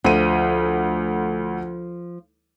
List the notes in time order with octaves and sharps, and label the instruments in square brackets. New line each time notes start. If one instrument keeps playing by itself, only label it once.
[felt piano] D2 D#7 [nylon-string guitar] F3